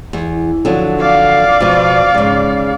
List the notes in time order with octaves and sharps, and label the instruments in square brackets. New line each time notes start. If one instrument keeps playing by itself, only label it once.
[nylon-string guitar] E2
D3 F3 F#3
[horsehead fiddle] D5 F5
[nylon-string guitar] B2 F3
G#2 C#3